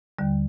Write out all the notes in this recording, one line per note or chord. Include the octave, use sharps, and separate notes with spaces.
D#2 D3 G3